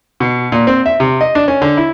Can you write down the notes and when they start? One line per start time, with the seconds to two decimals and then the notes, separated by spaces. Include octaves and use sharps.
0.20 B2
0.52 A#2
0.67 C4
0.86 E5
1.00 C3
1.21 D#5
1.35 D4
1.48 C#4
1.62 D3
1.77 E4